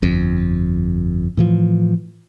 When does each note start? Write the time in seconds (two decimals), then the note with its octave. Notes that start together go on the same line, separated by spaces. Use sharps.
0.02 G1 F2
1.37 A2 E3 F3